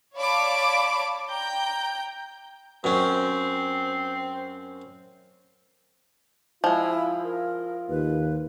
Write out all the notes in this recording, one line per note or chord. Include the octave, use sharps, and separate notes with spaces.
C#5 D5 F5 A5 B5 D6
G5 A#5 G6
F#2 C4 C#4
F3 G#3 E4 F4
A#4
D#2 B4